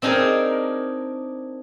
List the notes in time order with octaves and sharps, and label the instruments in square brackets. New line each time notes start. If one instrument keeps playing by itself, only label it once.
[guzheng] C4 D4 D#4 G#4 A#4